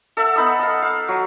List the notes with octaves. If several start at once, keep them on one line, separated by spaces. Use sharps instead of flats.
A4 E5 F#5
B3 D#4 B5 D#6
D#5 F5
F5
F#3